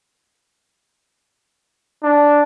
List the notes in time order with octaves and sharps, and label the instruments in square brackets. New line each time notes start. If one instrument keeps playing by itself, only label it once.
[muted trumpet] D4